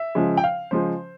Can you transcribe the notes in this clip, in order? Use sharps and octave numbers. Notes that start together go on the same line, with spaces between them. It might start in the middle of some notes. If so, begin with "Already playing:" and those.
Already playing: E5
C#3 F3 G#3
G5
F5
C#3 F3 G#3 C5